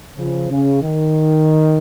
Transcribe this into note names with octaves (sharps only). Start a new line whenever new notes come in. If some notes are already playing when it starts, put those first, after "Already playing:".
C#3 F3
C#3
D#3